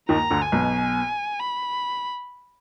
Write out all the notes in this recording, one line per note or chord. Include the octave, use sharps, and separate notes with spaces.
D#2 D#3 A#5
D2 D3
G#5
B1 B2
B5